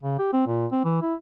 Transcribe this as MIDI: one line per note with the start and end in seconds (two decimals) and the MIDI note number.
0.03 0.16 49
0.19 0.32 67
0.33 0.44 60
0.46 0.66 46
0.72 0.80 60
0.84 0.99 52
1.02 1.14 64